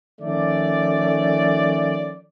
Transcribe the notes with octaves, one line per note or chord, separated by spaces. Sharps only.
D#3 F3 A3 C#4 D5